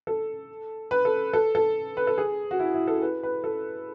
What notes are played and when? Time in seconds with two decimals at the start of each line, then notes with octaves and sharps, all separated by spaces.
0.07 A4
0.91 B4
1.05 A4
1.33 A4
1.55 A4
1.97 B4
2.07 A4
2.18 G#4
2.51 F#4
2.60 E4
2.74 E4
2.88 A4
3.02 B4
3.23 B4
3.44 A4